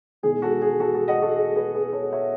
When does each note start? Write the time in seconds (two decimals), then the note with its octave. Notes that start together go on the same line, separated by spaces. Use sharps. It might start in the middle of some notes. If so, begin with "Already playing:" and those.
0.23 E1 E2 D#3 G#3 G#4
0.42 F#4 A4
0.62 G#4
0.80 F#4 A4
0.94 F#4 A4
1.08 D#5 F#5
1.22 F#4 A4
1.36 G#4
1.56 G#4 B4
1.74 G#4 B4
1.93 A4 C#5
2.12 C#5 E5